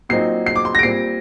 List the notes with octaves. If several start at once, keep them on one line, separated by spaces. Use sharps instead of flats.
A#2 F#3 C4 D#4 C7
C7
D6
C6
A#6 D7
A#2 G3 C4 C7